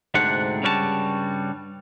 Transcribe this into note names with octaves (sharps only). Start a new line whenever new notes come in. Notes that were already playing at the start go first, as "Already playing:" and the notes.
D2 G#2 C3 C4 D4 F#5
G2 C#3 G3 F#4 G#4 A5